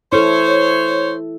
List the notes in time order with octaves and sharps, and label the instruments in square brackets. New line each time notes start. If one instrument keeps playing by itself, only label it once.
[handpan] E4 A4 [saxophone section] C5 C#5